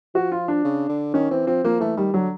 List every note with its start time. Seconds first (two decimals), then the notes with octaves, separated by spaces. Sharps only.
0.15 F3 F#4
0.32 F4
0.48 D4
0.64 C#3
0.89 D3
1.14 D#3 C#4
1.31 E3 C4
1.47 F3 C4
1.64 F3 A#3
1.80 E3 A3
1.97 D#3 G3
2.14 D3 F#3